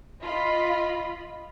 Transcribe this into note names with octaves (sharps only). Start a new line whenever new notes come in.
F4 D#5 B5